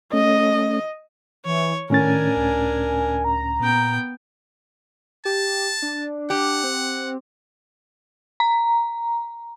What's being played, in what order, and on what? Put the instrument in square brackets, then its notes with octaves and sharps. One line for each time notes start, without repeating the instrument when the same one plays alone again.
[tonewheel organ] A3 C#4 [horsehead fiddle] D#5
[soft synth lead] E3 [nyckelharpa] C#5
[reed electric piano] A2 C#4 A6 [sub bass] D#3 [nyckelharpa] D4 A#4 [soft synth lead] G#5
[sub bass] C#2
[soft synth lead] A#5
[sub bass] A#2 [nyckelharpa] B3 G5
[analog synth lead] G4 [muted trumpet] A5
[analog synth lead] D4
[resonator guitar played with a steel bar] G4 [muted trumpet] F#5
[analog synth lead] C4
[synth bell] A#5